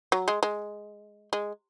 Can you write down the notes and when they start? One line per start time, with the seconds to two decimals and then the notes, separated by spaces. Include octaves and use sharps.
0.12 F#3
0.28 G#3
0.43 G#3
1.33 G#3